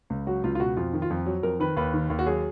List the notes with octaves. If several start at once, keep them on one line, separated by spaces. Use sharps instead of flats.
C#2
F#3 F#4
C#2 F4
F4
B2 F#4
F2 F4
D#3
F4
F2
F#3
F2 A#4
D#3 B4
D#2 B4
D#3
D#2
F#4
F#3 G#4